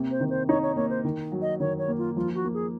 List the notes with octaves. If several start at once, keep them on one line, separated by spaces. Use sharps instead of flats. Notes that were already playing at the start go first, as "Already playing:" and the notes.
Already playing: C3 A#3 C#4
C5
D#3
C5
D#4 C#5
C#5
A#3 C#5
C5
D#3
F#3
D#5
D#3 C#5
C#5
A#3
F4
F3 F4
F#4
A#3
G#4